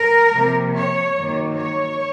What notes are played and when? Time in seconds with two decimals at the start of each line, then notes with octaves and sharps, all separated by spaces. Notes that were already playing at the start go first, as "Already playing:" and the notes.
Already playing: A#4
0.34 C3 F3 A#3
0.75 C#5
1.16 F#2 D#3 F#3 A#3
1.56 C#5